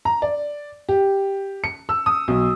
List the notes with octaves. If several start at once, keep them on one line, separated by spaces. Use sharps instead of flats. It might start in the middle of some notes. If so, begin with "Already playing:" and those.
A#5
D5
G4
C#7
E6
D#6
B1